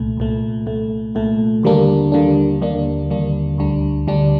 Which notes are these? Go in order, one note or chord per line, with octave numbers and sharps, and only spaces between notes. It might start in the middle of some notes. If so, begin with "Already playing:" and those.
Already playing: C2 A#2 A3
C2 A#2 A3
C2 A#2 A3
C2 A#2 A3
D#2 D3 G3 A#3 D4
D#2 D3 G3 A#3 D4
D#2 D3 G3 A#3 D4
D#2 D3 G3 A#3 D4
D2 D3 G3 D4
D2 D3 G3 D4